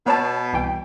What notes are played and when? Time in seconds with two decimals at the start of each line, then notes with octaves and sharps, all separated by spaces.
0.06 B2 B3 C#5 A5
0.53 C2 E3 G5